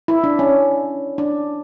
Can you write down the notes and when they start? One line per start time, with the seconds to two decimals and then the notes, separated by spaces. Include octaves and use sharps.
0.08 E4
0.24 D4
0.39 C#4
1.18 D4